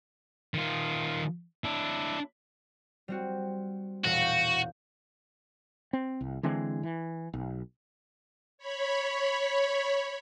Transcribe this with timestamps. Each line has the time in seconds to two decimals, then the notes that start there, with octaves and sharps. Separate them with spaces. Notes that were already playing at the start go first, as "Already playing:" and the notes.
0.54 D#3 F4
1.64 D4 E4
3.08 G3 C4 F#4
4.04 E1 A#2 F#4 F5
4.21 G6
5.93 C4
6.21 C2
6.43 D3 E3 G#3 C4
6.83 E3
7.33 B1
8.58 C#5 B5